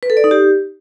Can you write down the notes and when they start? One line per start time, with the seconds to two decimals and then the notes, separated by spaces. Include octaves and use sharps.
0.03 B4
0.10 A4
0.17 D5
0.24 D#4
0.31 G4